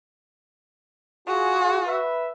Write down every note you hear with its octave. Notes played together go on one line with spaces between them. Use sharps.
F4 F#4 G#4
B4 E5